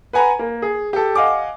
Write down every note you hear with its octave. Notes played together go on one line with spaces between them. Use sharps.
B4 F#5 G#5 A#5 B5
A#3
G#4
G4 A4
D#5 F5 F#5 G#5 D6